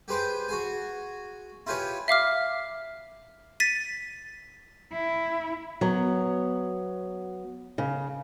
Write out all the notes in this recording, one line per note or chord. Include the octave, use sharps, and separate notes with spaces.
G4 G#4 B4 C5 G5
F#4 G#4 G#5
E4 F4 G4 G#4 B4 C#5
E5 F5 D6 F6
A6 B6 D#7
E4
F#3 B3
C#3